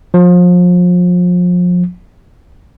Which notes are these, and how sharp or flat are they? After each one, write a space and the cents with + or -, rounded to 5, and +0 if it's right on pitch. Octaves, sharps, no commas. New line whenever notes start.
F3 +30